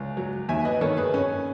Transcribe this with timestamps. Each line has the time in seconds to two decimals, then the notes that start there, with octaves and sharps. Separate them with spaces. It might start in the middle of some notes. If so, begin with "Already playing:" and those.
Already playing: C#2
0.17 F#3
0.49 D#2 E5 G#5
0.65 B4 D#5
0.81 D#3 A4 C#5
0.97 G#4 B4
1.14 C#4